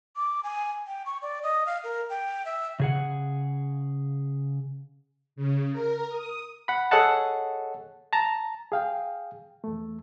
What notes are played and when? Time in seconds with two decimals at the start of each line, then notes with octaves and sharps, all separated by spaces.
0.16 D6
0.43 G#5
0.87 G5
1.06 C#6
1.22 D5
1.43 D#5
1.66 F5
1.84 A#4
2.10 G5
2.45 E5
2.80 C#3 G#4 F#5
5.36 C#3
5.72 A#4
6.09 D#6
6.68 F#5 B5
6.91 G#4 A4 C#5 D#5 F#5 A5
8.13 A5 A#5
8.72 G#4 F5 G5
9.64 E2 A3